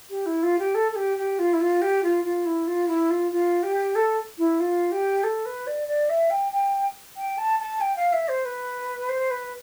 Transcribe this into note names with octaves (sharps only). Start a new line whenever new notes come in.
G4
E4
F4
G4
A4
A4
G4
G4
F4
E4
F4
G4
F4
F4
E4
F4
E4
F4
F4
G4
A4
E4
F4
G4
A4
B4
D5
D5
E5
G5
G5
G5
A5
A5
G5
F5
E5
C5
B4
C5
B4